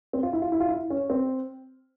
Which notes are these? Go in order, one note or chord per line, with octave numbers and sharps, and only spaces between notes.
C4
F4
E4
F4
E4
F4
E4
C#4
C4